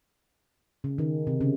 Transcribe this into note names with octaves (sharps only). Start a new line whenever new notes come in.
C#3
D#3
C3
C#3